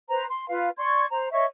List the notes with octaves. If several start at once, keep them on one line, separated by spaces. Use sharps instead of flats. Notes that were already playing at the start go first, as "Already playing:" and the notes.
B4 C5 A#5
C6
F4 B4 F5
D5 C6 C#6 G#6
C5 A#5
C#5 D#5 E5 C#6